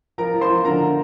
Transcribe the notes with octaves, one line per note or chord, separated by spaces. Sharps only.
F3 A#4 A#5
F3
C5 C6
F3
D3 A#4 A#5